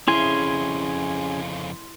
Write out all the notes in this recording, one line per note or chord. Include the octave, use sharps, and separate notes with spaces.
F2 C#3 C#4 E4 G#4 G#5 C6